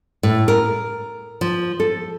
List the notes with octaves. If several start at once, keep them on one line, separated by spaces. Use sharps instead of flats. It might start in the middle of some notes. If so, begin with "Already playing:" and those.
A2
A#4
F3
A4